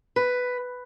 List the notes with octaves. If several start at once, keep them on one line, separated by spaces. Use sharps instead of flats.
B4